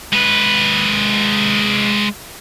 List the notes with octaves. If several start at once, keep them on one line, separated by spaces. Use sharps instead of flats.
G#3 B4